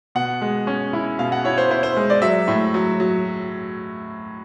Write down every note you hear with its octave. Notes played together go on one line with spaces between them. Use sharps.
B2 F#5
G#3
C#4
E4
B2 F5
F#5
E4 C#5
C5
E4 C5
C5
G#3
D5
F#3 E5
A2
F#3
F#3